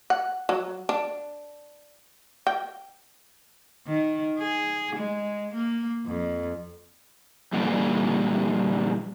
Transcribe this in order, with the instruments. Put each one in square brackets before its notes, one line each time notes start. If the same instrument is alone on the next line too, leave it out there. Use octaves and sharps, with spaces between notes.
[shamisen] F#5
F#3
D4
G5
[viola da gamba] D#3
G#4
G#3
A#3
F2
[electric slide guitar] G2 A#2 D3 E3